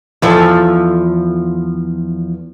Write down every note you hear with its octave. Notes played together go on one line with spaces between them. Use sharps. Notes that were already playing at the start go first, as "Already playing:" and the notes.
E2 F3 A4